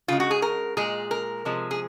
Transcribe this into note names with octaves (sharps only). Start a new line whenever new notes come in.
C#3 G#3 F4
F#4
G#4
A#4
A#2 G#3 G#4
A#4
C3 F3 G#3
G#4